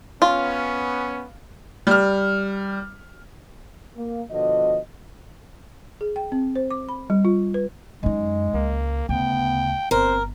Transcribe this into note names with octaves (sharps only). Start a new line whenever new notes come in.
B3 C#4 F4
G3 F6
A#3
B2 D3 F3 F#4 D#5
G#4
G5
C4
C5
D6
B5
G3
F4
B4
F#2 G#3 D#4
C#2 A#3
D2 C#3 B3 G5
G1 C4 A#4 C5